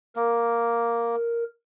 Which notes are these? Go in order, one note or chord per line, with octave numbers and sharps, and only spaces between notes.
A#3 A#4